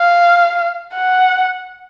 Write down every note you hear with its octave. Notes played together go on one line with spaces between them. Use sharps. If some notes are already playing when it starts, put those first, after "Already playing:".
Already playing: F5
F#5